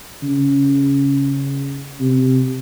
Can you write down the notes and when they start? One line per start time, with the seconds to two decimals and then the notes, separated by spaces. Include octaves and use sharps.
0.22 C#3
1.99 C3